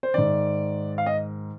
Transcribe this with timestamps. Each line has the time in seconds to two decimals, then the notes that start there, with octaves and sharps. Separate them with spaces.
0.03 C5
0.14 G#2 D#3 D5
0.98 F5
1.06 D#5